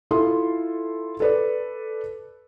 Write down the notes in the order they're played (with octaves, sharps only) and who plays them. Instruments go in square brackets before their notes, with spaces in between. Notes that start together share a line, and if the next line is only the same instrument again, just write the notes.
[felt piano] E4 F4 A4 C6
A4 B4 D5